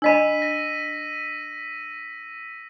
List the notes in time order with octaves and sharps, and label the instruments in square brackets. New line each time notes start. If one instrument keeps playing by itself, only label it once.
[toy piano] D4 D#5 B5 [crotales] E6 B6 D#7
[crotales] A#6